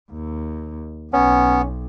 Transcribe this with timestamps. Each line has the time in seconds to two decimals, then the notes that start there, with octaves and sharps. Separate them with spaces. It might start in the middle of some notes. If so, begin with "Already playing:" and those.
0.12 D#2
1.13 B1 B3 C#4